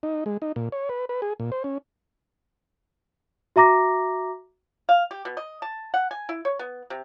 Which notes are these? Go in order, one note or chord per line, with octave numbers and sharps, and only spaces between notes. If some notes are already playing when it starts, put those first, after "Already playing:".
D#4
G#3
D#4
A#2
C#5
B4
B4
G#4
A#2
C5
C#4
F#4 E5 A#5 D6 A#6
F5
G4
B2
D#5
A5
F#5
G#5
E4
C#5
B3
C3